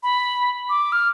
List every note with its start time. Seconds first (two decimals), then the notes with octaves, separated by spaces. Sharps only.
0.03 B5
0.69 D6
0.92 F6